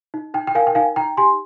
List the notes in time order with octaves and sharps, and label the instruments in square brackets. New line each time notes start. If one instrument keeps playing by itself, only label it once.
[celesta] D#4
D#4 G5
G5
A#4 F5 G#5
G5
D#4 F5 G#5
D#4 G5 A#5
G4 G#5 C6